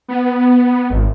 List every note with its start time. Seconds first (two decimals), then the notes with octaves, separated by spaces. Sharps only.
0.08 B3
0.90 G#1